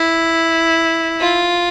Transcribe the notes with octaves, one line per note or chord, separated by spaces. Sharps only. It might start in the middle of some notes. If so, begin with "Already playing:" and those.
Already playing: E4
F4